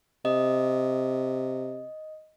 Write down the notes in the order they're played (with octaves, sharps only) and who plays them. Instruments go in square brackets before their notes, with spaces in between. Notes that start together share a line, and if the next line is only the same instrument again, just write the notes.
[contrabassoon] C3 [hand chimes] D#5